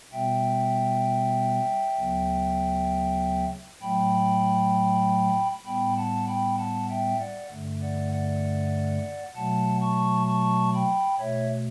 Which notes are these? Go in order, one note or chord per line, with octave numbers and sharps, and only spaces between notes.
B2 G3 B3 E5 G5
D2 C#3 F#3 B3
A2 F#3 A3 G5 B5
A2 G3 B3 G5 B5
F#5 A5
G5 B5
F#5 A5
E5 G5
D5 F#5
G2 D3 A3
D5 F#5
D5 F#5
B2 F#3 A3 F#5 A5
A5 C#6
A5 C#6
G5 B5
B2 A3 C#5 E5